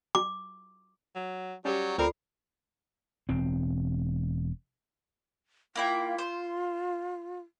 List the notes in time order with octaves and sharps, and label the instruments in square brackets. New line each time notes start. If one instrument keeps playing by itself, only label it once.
[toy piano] D6
[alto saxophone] F#3
[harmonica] F#3 [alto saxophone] G3 [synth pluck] C#4 G4
[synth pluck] D2 D5 C7 [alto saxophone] C4 [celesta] F4 A4 B5 [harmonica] A#4
[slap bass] E1 C4
[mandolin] A#3 E4 G5 [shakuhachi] F4
[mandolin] C5